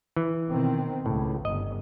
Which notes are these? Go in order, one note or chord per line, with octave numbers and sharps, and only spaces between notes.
E3
B2 D#3 C4
C#2 A2
G1 D#5